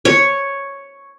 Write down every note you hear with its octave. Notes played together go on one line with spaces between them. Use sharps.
C#5